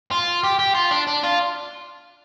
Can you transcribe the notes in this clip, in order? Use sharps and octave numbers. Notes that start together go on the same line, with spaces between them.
F4
G4
G4
F4
D4
D4
F4